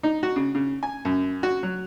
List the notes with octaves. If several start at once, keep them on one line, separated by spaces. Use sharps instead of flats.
D#4
F#4
C#3
C#3
G#5
F#2
F#4
F#3